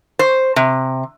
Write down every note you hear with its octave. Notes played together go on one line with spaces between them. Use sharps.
C5
C3